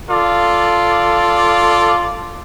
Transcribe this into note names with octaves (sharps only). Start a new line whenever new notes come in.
F4 A4 D5